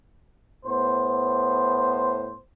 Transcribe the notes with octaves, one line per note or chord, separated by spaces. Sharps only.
A2 B3 C5